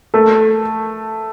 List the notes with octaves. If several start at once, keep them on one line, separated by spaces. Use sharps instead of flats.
A3 A4